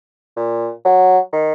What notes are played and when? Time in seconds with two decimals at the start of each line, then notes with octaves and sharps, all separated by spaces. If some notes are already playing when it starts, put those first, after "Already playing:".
0.36 A#2
0.85 F#3
1.33 D#3